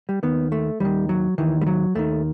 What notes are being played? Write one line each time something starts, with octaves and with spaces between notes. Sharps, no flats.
G3
D#2 D#3 B3
A3
D#2 D#3 G3
F#3
D#2 D#3 E3
G3
F#3
D#2 D#3 A3